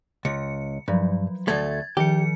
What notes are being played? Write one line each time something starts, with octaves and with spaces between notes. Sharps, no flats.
C#2 C#7
G2 F3 F#3
D2 A3 G#6 A6
D#3 F3 G4 C#7